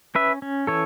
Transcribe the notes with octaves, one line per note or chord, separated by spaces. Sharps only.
C#4 B4 E5
C#4
E3 A4 C#5